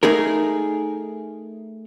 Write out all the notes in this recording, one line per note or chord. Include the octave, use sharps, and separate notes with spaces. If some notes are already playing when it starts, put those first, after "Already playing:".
A3 D#4 G#4 A#4